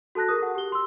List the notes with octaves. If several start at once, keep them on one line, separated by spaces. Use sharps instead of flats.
F#4 A4 A5 F#6 A#6
G#4 A#4 D#6
F#5
G4 G7
C6 E6